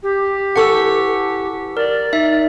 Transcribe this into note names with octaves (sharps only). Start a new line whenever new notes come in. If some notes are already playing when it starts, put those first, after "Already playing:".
G4
E3 A4 F#5 C#6 E6
A#4 D5
D#4 E5